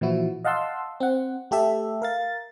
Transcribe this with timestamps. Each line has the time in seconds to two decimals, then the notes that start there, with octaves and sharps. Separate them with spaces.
0.01 A#2 E3 F3 E4 F#4
0.45 D#5 F5 F#5 A5 C6 E6
1.00 C4 F#5
1.51 A3 G4 A4 E5
2.02 A#4 F5 A6